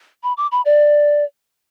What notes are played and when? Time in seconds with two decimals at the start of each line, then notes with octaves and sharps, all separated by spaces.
0.23 B5
0.37 D6
0.52 B5
0.65 D5